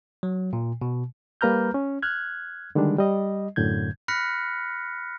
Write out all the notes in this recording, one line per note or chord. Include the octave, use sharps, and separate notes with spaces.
F#3
A#2
B2
G3 A#3 B4 A#5 F6 G6
C#4
F6 F#6 G#6
D3 D#3 G3 G#3 D4
G3 D#5
F#2 A2 D3 G6 G#6
B5 F6 F#6 A#6 B6 C#7